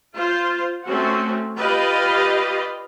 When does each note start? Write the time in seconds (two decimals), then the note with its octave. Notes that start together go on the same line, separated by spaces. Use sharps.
0.15 F4 C5
0.85 A3 C4 C#4 F#4
1.58 F4 G4 B4 D5 D#5 F5